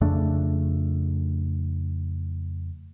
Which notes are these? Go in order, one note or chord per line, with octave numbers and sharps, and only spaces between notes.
F2 C#3 A3 D4